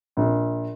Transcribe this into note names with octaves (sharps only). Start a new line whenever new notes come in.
A#1